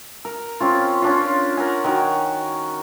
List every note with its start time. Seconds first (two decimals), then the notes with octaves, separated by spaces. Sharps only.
0.25 A#4
0.60 C4 C#4 F4
1.02 C#4 D4 F4
1.57 A#4 F#5 G#5
1.84 D#3 F#4 A#4